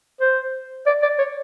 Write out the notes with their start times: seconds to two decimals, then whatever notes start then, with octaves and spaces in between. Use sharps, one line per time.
0.21 C5
0.86 D5
1.02 D5
1.19 C#5